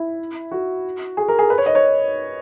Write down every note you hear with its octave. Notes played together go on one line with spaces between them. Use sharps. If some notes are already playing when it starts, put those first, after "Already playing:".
Already playing: E4
F#4
G#4
A#4
G#4
B4
C#5
D#5
C#5